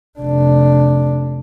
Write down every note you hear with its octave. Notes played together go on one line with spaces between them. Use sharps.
F1 D4